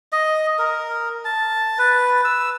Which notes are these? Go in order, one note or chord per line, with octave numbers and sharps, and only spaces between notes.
D#5
A#4
A5
B4
E6